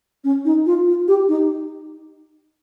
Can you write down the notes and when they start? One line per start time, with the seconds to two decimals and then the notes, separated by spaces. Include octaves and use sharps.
0.24 C#4
0.45 D#4
0.66 F4
0.87 F4
1.08 G4
1.28 D#4